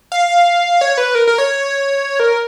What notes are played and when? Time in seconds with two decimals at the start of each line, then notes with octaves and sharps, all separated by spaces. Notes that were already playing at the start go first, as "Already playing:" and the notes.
0.12 F5
0.81 C#5
0.98 B4
1.15 A#4
1.27 A#4
1.38 C#5
2.20 A#4